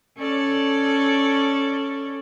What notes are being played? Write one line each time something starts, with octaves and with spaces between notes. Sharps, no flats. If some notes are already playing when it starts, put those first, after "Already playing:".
C#4 A4 D5